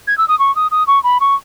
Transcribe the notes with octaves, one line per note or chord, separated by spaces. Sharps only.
G#6
E6
D#6
C#6
D#6
D#6
C#6
B5
C#6